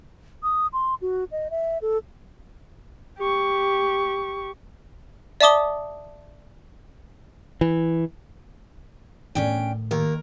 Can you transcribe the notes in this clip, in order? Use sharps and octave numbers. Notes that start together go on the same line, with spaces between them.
D#6
C6
F#4
D#5
E5
A4
G4 C#6
D5 E5 A5 D6 D#6 G7
E3
A2 D#3 C#4 D4 G5
D#2 A#4